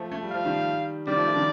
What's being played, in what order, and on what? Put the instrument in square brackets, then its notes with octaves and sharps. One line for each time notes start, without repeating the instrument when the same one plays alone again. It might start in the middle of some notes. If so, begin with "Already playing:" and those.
Already playing: [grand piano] F3 A3
A3
G3
[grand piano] F3 [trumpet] F5
[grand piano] D#3 G3
[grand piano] D#3 G3 [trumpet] D5
[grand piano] F3 A3
F3 A3
D#3 G3